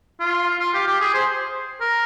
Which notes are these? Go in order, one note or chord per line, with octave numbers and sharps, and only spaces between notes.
F4
F4
G4
G4
G#4
C5
A#4